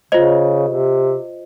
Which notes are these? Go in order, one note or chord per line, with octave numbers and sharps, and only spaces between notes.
C#3 F4 C5 D#5
C3